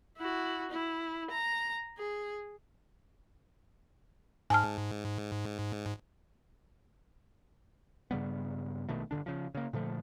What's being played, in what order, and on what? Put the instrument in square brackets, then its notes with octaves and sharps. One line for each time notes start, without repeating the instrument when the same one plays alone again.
[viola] E4 F#4
E4
A#5
G#4
[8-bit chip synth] G#2 [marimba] G#5 A5 F6
[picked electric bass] G2 C#3 G3 B3
A#1 B2 D#3 A3
G1 B2 D3 D4
C#3 F3
C#3 A#3
A#2 D3 F3 A3